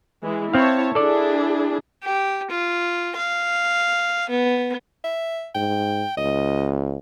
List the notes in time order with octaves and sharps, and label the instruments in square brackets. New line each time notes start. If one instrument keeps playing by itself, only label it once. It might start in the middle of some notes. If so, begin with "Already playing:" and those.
[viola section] E3 G#3
[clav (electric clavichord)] C4 F5 [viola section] E4 C#5 A5
[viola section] D4 E4 G#4 [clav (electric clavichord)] A4 D5
[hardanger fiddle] G4
F4
F5
B3
[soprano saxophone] E5
[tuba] G#2 [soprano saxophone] G5
[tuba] C#2 [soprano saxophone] D#5